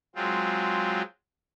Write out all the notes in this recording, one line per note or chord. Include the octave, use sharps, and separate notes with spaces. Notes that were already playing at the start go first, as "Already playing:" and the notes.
F#3 G#3 C4 F4